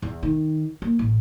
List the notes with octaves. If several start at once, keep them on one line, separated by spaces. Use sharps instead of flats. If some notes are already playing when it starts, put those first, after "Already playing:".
E2
D#3
A#3
A1